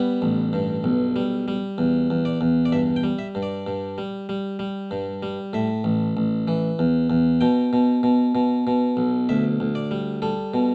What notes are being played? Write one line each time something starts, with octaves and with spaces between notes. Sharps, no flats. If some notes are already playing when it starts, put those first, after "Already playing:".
Already playing: G3 B3
A1
G2
B1
G3
G3
E2
E2
D5
E2
D5
G2 E5
G5
G3
E5
G2
D5
G2
G3
G3
G3
G2
G3
A2 E5
A1
A1
E3
E2
E2
B2 G5
B2
B2
B2
B2
B1
D2 E5
D2
D5
G3
G3 A4
B2